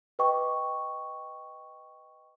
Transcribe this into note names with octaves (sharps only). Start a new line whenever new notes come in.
B4 D#5 G5 C#6 D6